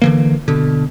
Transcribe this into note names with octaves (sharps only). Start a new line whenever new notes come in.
D3 E3 A#3
B2 D3